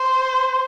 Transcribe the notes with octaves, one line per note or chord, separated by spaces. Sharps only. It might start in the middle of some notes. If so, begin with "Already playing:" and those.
Already playing: C5